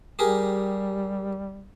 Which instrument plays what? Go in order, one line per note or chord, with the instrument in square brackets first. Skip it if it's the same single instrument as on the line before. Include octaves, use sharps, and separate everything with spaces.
[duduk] G3 [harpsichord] G4 G#4 A#4